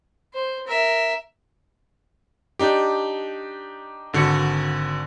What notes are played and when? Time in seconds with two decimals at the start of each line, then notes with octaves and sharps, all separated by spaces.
0.33 C5
0.67 A#4 E5
2.59 D4 D#4 G4
4.13 G#1 D3 F#4 C#7